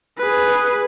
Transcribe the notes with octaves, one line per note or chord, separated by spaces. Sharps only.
G#4 B4